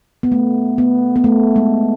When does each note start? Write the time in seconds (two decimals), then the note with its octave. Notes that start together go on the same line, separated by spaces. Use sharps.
0.23 B3
0.32 A3
0.78 B3
1.16 B3
1.24 A3
1.56 G#3